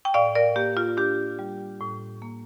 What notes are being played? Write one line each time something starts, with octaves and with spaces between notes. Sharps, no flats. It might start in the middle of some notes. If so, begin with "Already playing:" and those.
G5
A2 D5 F5
A#4 D5
A#3 G4
F4
D4 G4
G3
A2
A#3